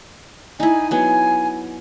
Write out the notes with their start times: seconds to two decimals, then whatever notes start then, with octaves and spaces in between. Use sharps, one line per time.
0.60 D#4 E4 G#5
0.91 F#3 B3 G#5